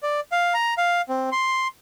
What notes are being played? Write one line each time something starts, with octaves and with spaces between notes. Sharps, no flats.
D5
F5
A#5
F5
C4
C6